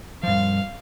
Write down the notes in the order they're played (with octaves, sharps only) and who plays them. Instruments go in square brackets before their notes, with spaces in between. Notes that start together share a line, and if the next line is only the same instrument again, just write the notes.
[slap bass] G2 F3 [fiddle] F5